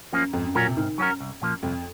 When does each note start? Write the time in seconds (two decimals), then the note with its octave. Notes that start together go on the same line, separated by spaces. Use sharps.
0.12 F#2 F3 A#3 C#4
0.33 F2 G#2
0.44 F#2
0.55 A#2 F#3 C#4 F#4 A#4
0.67 C3
0.77 G#2 D#3
0.98 F#2 F#3 C#4 F#4 A#4
1.20 C2
1.42 A#2 F3 A#3
1.63 C2 F2